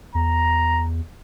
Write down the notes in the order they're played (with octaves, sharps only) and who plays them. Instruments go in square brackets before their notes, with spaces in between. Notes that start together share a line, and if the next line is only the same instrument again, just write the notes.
[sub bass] E2 [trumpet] A#5